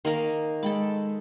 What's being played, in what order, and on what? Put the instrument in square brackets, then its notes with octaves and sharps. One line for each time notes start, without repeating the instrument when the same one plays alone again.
[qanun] D#3 A#3 A#4
[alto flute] G#3 [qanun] A4 G5 B5